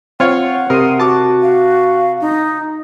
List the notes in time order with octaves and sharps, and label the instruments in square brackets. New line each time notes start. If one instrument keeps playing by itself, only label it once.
[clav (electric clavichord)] C4 [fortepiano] F4 C#5 [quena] F#5
[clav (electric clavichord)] C3 A#5 [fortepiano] A#4 [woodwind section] C6 D#6
[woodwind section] F#4 [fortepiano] A5 D6
[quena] F5
D#4